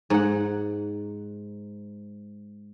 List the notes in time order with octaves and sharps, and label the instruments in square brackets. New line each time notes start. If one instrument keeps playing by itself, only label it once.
[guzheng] G#2 F#5